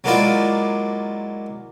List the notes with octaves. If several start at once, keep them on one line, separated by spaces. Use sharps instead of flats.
F#3 G#3 A#3 E4 F4 D5